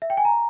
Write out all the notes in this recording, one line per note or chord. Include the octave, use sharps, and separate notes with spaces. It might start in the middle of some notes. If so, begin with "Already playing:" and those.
E5
G5
G#5
A#5